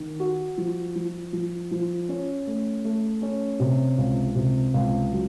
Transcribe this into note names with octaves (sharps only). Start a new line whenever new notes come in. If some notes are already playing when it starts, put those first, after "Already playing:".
Already playing: D#3
F#4
F3
F3
F3
F3
C#4
A3
A3
C#4
C3
C#2
C3
C#2
F#3